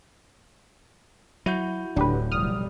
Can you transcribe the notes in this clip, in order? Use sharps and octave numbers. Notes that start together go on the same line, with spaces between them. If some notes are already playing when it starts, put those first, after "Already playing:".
F#3 E4 F#4 G6
D1 A2 D3 D4 G4 B4
F1 B1 G3 D#6 F6